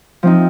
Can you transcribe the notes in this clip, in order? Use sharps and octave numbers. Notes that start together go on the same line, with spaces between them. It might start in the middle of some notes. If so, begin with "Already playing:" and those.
F3 C4 D#4